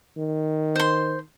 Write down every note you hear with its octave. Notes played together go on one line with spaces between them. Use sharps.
D#3
C5 C6